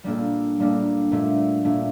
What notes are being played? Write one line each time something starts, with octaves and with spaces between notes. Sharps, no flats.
A#2 G3 A#3 D4 A4
A#2 G3 A#3 D4 A4
A#2 A3 D4
A#2 A3 D4